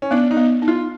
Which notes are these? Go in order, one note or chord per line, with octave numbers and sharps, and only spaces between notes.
C#4
B3 D4
D#4
B3
D#4
F4